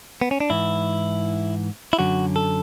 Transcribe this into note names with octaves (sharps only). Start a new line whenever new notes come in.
B3
C#4
D4
G#2 E3 E4
E4
F#2 D3 F#3 F#4
A4